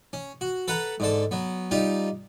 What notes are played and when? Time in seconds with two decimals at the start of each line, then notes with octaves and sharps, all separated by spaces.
0.13 C#4
0.41 F#4
0.68 A4 B4 F#5 A#5
1.00 G#2 D3 A4
1.31 F#3 B3
1.71 G3 D#4 F4 G4